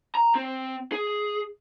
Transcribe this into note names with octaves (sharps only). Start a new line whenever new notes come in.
A#5
C4
G#4